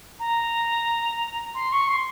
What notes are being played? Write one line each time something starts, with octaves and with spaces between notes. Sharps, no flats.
A#5
C6
C#6
C6